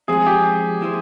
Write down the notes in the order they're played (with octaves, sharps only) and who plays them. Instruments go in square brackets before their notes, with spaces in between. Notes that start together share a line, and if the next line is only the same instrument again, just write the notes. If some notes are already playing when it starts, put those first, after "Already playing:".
[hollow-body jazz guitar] F3 G#3 C4 [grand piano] G#4
[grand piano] G4
[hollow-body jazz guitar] F3 A#3 E4 G#4 C5